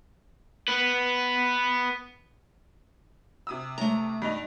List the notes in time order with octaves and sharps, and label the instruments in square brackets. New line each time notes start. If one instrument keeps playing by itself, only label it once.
[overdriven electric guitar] B3 B4
[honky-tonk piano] C3 D#6 E6
[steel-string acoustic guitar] A3 A#5
[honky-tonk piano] G2 D#4 F7